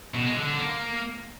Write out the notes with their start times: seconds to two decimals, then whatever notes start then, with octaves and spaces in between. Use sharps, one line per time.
0.15 B2
0.26 G#3
0.37 D3
0.48 D3
0.59 A#3